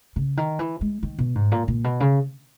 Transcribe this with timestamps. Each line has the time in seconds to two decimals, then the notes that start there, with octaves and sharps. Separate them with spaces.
0.16 C#3
0.37 D#3
0.59 E3
0.81 G#3
1.03 D#3
1.19 B2
1.35 G#2
1.52 A#2
1.68 A#2
1.84 B2
2.00 C#3